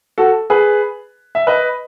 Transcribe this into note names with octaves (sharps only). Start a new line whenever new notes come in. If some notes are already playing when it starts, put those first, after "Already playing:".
F#4 A4
G#4 B4
E5
B4 D#5